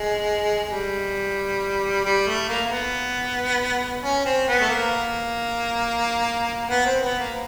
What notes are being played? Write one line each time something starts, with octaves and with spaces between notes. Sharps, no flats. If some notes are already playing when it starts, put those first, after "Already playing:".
Already playing: G#3
G#3
G3
G3
A3
A#3
A#3
B3
C#4
C4
B3
A3
A#3
B3
C4
B3
A#3